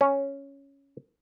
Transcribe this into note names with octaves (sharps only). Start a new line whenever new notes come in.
C#4